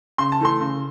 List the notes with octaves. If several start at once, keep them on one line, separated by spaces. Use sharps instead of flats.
C#3 C6
A5
E3 A3 C6
C#3